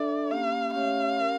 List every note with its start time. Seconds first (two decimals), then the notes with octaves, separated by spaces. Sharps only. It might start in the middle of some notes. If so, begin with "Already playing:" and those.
Already playing: D4 A4 D5 E5
0.30 A#3 C#4 G4 F5
0.73 A3 C#4 G4 C#5 E5 F5
1.16 C#4 G4 A#4